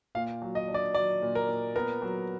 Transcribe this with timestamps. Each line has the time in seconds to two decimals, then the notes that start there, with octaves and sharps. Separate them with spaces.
0.15 A#2 F5
0.42 F#3
0.55 D#5
0.68 D4
0.74 D5
0.94 F#3 D5
1.22 A#2
1.35 A#4
1.49 A#2
1.76 B3 A#4
2.02 F#3